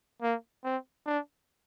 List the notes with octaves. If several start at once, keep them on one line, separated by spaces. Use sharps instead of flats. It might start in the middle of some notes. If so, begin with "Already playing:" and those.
A#3
C4
D4